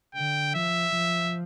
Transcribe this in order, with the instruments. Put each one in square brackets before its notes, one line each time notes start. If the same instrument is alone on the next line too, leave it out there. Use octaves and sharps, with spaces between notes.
[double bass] D3 [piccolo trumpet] G5
[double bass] F3 [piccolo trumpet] E5
[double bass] F3